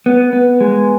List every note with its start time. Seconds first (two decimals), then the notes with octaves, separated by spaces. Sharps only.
0.06 B3
0.33 B3
0.61 G#3